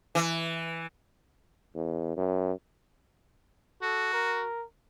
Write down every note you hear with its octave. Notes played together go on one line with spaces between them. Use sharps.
E3
E2
F#2
F#4 A4
A#4